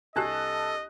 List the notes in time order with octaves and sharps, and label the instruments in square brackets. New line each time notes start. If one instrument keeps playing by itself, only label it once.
[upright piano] C2 A5 F#6 [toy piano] D4 G4 [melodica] A4 [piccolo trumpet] D#5